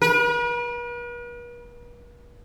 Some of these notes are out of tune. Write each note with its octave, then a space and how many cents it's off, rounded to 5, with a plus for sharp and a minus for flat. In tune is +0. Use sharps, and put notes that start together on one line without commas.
B4 -45